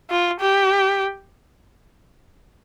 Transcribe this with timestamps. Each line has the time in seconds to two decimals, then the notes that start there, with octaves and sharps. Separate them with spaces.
0.10 F4
0.40 G4